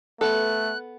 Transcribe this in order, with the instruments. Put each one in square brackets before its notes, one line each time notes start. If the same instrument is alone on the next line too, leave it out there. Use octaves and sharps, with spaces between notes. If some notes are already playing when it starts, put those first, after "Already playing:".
[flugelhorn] A3 [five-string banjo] B3 A4 [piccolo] F#6